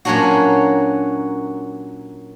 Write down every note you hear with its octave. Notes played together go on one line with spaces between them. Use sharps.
A#2 F#3 A#3 C#4 D4 F#4